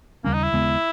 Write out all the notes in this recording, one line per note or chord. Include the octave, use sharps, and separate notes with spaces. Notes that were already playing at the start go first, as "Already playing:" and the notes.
D#2 C#3 G3 A#3 C#4
D#4
E4
D#2 C#3 G#3 B3